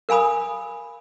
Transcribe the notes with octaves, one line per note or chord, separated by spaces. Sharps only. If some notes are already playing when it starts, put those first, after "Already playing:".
A#4 F5 G#5 B5 D#6